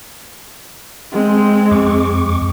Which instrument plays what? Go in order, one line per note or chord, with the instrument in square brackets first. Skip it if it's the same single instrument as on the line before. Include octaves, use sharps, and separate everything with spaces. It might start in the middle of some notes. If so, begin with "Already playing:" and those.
[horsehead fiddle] G#3 C4
[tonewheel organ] F2 C#6 D6